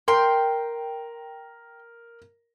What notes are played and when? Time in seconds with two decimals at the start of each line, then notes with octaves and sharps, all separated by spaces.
0.08 A#4 G5 C6